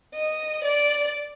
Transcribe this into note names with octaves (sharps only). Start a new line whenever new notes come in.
D#5
D5